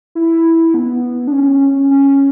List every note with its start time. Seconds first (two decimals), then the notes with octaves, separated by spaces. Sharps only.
0.15 E4
0.74 B3
1.27 D4
1.32 C#4
1.91 C#4